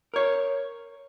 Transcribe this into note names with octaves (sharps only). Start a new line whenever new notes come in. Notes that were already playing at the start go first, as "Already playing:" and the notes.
A#4 C#5